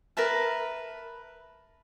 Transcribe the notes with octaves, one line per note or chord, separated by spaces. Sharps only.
A#4 B4 E5 A5